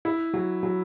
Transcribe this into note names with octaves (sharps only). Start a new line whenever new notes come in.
E4
F#3
F#3